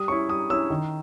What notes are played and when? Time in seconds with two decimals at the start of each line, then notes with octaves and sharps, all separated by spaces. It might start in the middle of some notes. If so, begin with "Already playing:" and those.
Already playing: G3 D#6
0.08 C#4 E4 C#6
0.29 G3 D#6
0.50 C#4 E4 E6
0.70 D#3